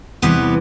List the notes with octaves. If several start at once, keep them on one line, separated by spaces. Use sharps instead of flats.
E2 C3 E3 G3 B3